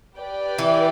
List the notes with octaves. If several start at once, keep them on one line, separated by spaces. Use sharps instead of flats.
G4 B4 D5 G5
E3